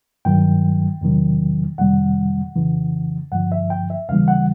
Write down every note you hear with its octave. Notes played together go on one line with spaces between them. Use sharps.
G2 D#3 F#3 G5
E2 C3 D#3 F#3
F2 C3 D#3 G3 F#5
F2 C#3 E3
G2 D3 F3 F#5
E5
G5
E5
D#2 C#3 E3 G3 F5
F#5